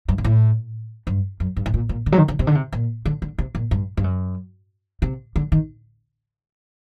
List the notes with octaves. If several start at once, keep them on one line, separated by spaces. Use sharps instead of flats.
G2
A#2
A2
G2
F#2
G2
A2
A#2
A#2
D3
F#3
D#3
D3
C3
D3
C3
A#2
D3
D3
C3
A#2
G2
G2
F#2
C3
D3
D#3